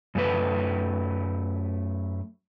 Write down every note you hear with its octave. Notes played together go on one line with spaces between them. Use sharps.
F#2 A3 B4